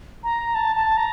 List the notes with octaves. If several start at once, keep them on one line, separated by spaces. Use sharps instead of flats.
A#5
A5
A5
A#5